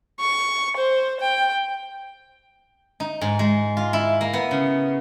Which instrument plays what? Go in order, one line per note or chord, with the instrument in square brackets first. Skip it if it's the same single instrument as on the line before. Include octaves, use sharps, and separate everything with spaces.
[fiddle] C#6
C5
G5
[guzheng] D#4
G#2
G#3
F4
E4
A#3
B3
C#3